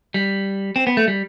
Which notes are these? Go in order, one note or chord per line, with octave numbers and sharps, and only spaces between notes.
G3
C4
B3
A3
G3